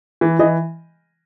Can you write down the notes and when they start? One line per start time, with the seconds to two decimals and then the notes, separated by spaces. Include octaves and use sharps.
0.21 E3
0.39 E3 D#5